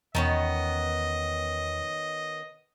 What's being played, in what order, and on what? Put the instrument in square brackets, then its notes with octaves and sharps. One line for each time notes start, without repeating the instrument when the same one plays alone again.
[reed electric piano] E2 [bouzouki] D#3 B3 C#4 [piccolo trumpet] D#5